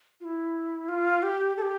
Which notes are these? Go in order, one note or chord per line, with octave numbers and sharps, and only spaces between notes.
F4
E4
F4
G4
A4
G4